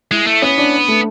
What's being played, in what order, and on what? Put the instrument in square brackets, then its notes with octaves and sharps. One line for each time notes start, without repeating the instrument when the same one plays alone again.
[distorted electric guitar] G#3 [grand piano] E4
[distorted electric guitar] A3
[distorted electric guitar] B3 [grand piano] C#4
[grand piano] D4
A3